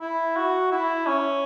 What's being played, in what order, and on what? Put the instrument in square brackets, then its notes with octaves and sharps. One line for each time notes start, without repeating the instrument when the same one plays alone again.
[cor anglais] E4
F#4
E4
C#4